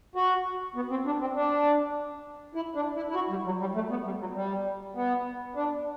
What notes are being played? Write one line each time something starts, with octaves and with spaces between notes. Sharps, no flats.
F#4
B3
C4
D4
C4
D4
E4
D4
E4
E4
F#4
G3
F#3
G3
A3
B3
G3
F#3
G3
B3
D4